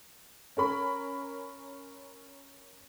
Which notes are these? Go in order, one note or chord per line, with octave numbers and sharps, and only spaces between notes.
C#4 A#4 B5